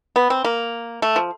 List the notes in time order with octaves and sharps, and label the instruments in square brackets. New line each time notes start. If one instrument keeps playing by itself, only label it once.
[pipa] B3
C4
A#3
A3
F3